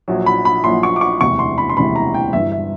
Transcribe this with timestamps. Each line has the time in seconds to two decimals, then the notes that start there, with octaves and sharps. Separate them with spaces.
0.08 A#1 A#2 F#3
0.26 B5
0.45 B5
0.64 A#1 A#2 F#3 C6
0.83 C#6
0.96 D6
1.01 C#6
1.21 E1 D2 C3 E3 C#6
1.39 C6
1.58 B5
1.69 C6
1.77 E1 D2 C3 E3 B5
1.96 A#5
2.14 G5
2.33 G1 G2 E3 E5
2.52 E5